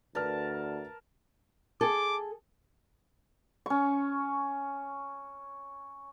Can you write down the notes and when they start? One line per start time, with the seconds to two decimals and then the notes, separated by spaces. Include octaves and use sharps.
0.15 D2 A#4 B4 D5 A5 F6
1.81 G#4 A4 D6
3.66 C#4 C#6